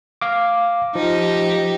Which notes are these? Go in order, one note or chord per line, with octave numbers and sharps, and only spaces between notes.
F5 D6
F3 D#4 G4